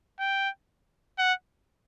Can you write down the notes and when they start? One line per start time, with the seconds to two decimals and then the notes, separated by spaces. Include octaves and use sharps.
0.20 G5
1.19 F#5